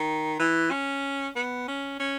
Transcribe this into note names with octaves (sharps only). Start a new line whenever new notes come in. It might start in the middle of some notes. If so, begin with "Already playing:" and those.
Already playing: D#3
E3
C#4
B3
C#4
C#4